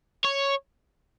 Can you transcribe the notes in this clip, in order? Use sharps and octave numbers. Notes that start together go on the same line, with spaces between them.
C#5